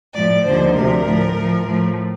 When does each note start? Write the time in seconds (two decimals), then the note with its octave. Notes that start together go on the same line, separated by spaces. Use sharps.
0.15 A2 F3 D5
0.45 D#2 D3 F3 C5
0.74 D2 C3 F3 A#4
1.04 A2 F3
1.35 A2 F3
1.65 A2 F3